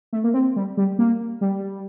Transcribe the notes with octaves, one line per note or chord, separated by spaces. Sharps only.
A3
A#3
C4
G3
G3
A#3
G3